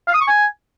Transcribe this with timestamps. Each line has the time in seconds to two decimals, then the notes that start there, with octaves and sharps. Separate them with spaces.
0.08 F5
0.14 D#6
0.21 C#6
0.27 G#5